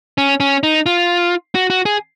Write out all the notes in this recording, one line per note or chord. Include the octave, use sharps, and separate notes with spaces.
C#4
C#4
D#4
F4
F#4
F#4
G#4